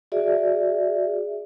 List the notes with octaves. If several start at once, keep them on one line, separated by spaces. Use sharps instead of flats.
F#4 G#4 D5 E5